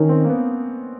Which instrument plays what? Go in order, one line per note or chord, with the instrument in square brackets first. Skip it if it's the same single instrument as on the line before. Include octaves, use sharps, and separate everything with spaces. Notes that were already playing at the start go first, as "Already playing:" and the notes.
Already playing: [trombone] D#3 [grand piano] C#4 D#4
[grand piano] C4
A#3
B3